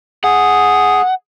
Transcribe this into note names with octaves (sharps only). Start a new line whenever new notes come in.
G#4 F#5